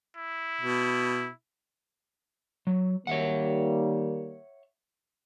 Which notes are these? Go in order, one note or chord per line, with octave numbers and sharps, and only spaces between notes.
E4
B2
F#3
D#3 G3 A#3 C#5 E5 F#5